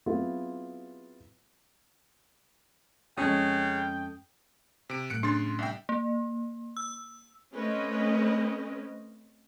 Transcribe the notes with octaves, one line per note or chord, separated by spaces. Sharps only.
F#3 B3 C4 E4 F4 G#4
F2 C#3 G#3 C#4 A4 G5 D#6
C3 D7
A2 F#3 F#6 C#7 D7
C#3 D4 C6 A6
C2 E5 G5
A#3
E6
A3 C4 C#4 B4 D#5